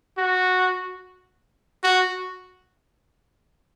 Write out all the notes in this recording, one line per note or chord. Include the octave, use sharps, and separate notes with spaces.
F#4
F#4